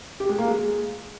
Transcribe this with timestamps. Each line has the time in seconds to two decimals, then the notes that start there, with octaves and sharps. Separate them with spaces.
0.20 G4
0.29 G#3
0.38 A#3
0.48 G#3